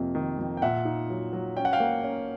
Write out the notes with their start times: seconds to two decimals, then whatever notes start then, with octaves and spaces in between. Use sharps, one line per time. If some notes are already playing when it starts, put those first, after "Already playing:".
Already playing: F2 C3 A#3
0.15 D#3
0.38 F2
0.57 G5
0.62 A#2 E5 F#5
0.85 D#4
1.10 F#3
1.33 F#3
1.57 C#4 G5
1.65 F#5
1.73 F5 G5
1.80 A#3
2.04 C#4